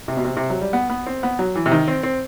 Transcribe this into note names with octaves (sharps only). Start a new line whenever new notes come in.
C3
B2
C3
C3
F#3
G3
B3
B3
C4
B3
F#3
E3
C3
D#3
C4
C4